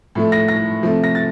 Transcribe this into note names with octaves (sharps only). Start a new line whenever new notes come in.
A2 F3 A3
A#6
A#6
C3 F3 A3
A#6
A6